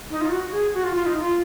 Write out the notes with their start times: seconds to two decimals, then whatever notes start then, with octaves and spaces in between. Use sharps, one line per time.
0.11 D#4
0.21 F4
0.31 F#4
0.52 G#4
0.74 F#4
0.84 F4
0.95 F4
1.06 D#4
1.17 F4